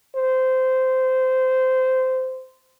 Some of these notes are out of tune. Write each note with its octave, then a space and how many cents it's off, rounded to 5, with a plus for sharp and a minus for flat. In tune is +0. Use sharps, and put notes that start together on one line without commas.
C5 -15